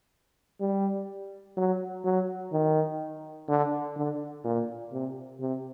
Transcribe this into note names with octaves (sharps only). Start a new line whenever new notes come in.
G3
F#3
F#3
D#3
D3
D3
A#2
C3
C3